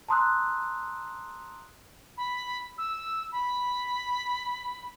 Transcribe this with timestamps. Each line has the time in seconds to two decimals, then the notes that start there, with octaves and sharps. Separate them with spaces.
0.08 A5 A#5 C6 D#6 E6 F#6
2.17 B5
2.78 E6
3.32 B5